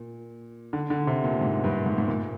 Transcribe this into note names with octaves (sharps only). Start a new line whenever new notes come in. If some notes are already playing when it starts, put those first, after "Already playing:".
Already playing: A#2
D3
D3
C3
A#2
G#2
G2
G#2
G#2
A#2